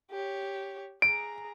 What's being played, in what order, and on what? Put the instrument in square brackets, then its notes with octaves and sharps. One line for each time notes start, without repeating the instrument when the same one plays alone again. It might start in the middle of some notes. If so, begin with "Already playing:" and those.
[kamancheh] G4 C#5
[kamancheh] G#4 A#5 [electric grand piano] D7